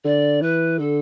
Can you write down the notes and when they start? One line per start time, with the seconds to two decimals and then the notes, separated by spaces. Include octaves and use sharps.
0.05 D3 D5
0.41 E3 B4
0.79 D3 A4